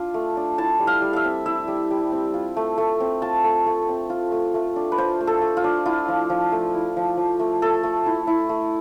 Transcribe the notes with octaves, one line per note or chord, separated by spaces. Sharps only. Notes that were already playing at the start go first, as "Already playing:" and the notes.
Already playing: D4 F4
A3
D4
E4 A5
G3
F5
G3
E5 F5
C4
E4 E5
G3
G3
C4
F4
A3
A3
C4
F4 A5
A3
A3
C4
F4
A3
A3
D4
B4
F4 C5
A3
A4
A3
F4
D4
E4 F4
F3
F3
A3
E4
F3
F3
A3
A3 A4
A3
E4
E4
A3